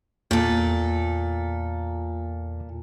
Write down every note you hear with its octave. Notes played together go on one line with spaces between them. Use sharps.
E2 A#2 A4